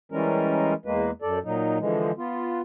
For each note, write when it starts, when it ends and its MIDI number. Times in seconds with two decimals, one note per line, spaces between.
0.12 0.74 52
0.12 0.74 55
0.12 0.74 56
0.12 0.74 61
0.12 0.74 70
0.85 1.11 40
0.85 1.11 56
0.85 1.11 58
0.85 1.11 71
1.22 1.39 42
1.22 1.39 69
1.22 1.39 74
1.44 1.78 46
1.44 1.78 54
1.44 1.78 63
1.80 2.11 50
1.80 2.11 52
1.80 2.11 53
1.80 2.11 56
2.18 2.61 59
2.18 2.61 65